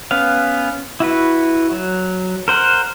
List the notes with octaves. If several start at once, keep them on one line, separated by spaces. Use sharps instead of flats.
B3 C#4 F5
E4 F#4 B4
F#3
A#4 C5 F#5